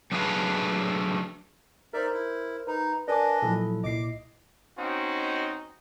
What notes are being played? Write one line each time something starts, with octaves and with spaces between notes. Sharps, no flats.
F#3 A3 D4 G#4 B4 F5
D#4 A#4 C5 D5 E5
E4
D#4 B4
D4 A#4 B4 D5 D#5 G#5 D6
A#2 F3 F#3 E4 A4
C2 A#2 E4 D#5 D6 C7
C4 C#4 D#4 F#4